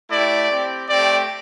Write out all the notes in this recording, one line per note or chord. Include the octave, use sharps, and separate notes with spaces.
A3 E4 G4 D5
C4 G4
A3 C4 G4 D5